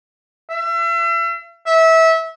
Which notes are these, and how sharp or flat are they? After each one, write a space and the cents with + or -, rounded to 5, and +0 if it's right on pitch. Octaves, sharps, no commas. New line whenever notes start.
E5 +40
E5 -25